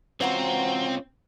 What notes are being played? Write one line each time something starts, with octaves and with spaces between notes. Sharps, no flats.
E3 C4 C#4 F4 F#4 A#5